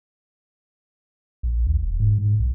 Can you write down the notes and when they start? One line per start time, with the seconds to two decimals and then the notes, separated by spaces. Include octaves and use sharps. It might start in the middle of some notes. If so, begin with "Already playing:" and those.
1.43 A#1
1.67 D#2
1.83 E1
2.00 G#2
2.18 G#2
2.40 B1